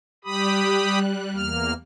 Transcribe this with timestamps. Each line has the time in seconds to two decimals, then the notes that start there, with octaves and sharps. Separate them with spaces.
0.25 G3 G4 B5 D#6 F#6
1.35 E2 A#3 F6